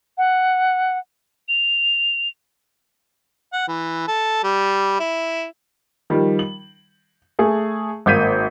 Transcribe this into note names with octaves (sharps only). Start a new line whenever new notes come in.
F#5
F7
F#5
E3
A4
G3
E4
D#3 F3 G3
F#7
A3 G#4
G#1 A#3 G6 B6 D#7